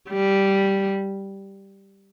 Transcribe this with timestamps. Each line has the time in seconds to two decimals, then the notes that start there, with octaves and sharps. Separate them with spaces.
0.10 G3